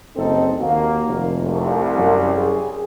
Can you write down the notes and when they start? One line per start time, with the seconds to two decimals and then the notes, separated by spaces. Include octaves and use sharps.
0.17 F#1 C4 D#4 A4
0.61 D#2 A#3 F#4
1.08 F1
1.44 C2 A3
1.98 F#2 C#4
2.36 G#4